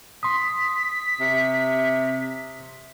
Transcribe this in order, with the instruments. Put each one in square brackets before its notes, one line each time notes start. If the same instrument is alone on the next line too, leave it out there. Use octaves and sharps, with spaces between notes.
[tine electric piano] C6 D#6 [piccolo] B6
[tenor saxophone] C3